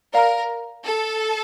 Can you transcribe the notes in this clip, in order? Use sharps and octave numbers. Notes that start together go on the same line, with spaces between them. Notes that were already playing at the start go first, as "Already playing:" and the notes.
A#4 D5 F5 A#5 F6
A4